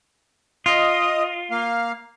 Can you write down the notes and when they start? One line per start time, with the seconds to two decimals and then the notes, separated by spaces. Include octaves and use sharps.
0.66 F4 D#5
1.51 A#3 F5